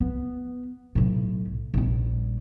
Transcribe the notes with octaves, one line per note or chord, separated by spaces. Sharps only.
B3
B1 A2
A#1 G3